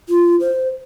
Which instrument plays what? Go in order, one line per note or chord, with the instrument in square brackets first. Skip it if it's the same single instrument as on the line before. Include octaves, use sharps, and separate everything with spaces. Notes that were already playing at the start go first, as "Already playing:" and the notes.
[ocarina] F4
C5